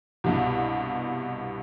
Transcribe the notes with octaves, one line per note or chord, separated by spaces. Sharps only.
C2 G2 B2